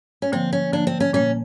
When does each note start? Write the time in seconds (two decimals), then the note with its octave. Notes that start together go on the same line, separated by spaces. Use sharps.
0.22 C#4
0.32 D3 F3 A#3 C4
0.53 C#4
0.73 D3 F3 A#3 D4
0.87 C4
1.00 C#4
1.13 A#2 G3 A#3 C#4